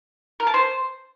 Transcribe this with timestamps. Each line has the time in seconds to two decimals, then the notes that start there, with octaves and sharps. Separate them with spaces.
0.40 A#4
0.47 A5
0.54 C5